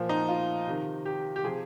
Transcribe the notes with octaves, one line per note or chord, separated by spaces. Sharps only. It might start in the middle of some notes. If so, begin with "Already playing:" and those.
Already playing: A#2 F3
D#4
F4
C3 D#3
G4
G4
C3 F3 G#4